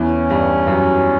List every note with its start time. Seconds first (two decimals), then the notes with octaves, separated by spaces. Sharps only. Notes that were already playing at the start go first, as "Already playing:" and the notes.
Already playing: E2 E3 C#4
0.30 G2 G3
0.67 F#2 F#3